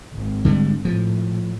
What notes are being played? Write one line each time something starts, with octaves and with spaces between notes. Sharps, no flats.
G#1
D3 G3 G#3
A2 F3